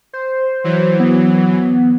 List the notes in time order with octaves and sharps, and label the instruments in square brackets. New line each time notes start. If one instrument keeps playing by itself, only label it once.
[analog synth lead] C5
[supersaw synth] E3 F#3
[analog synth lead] B3